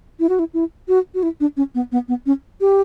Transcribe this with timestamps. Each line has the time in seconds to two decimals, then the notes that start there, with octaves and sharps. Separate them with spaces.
0.20 E4
0.29 F#4
0.39 E4
0.54 E4
0.88 F#4
1.14 F#4
1.23 E4
1.40 D4
1.57 C#4
1.75 B3
1.92 B3
2.08 B3
2.26 C#4
2.61 G4